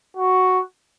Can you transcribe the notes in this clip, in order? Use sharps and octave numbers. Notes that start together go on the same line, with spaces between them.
F#4